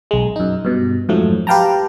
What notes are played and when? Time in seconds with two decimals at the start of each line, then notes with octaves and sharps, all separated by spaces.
0.11 B1 G#3
0.36 F#2 D#4
0.65 G2 B2
1.09 F2 G#2 F3 F#3 A3
1.47 G4 B4 F5 G5 A5 A#5